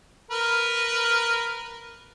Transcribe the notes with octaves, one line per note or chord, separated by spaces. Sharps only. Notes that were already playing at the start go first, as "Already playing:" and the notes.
A#4 B4